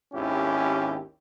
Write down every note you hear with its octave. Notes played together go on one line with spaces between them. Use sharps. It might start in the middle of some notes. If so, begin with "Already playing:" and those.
G#1 D#2 C#4 E4 G4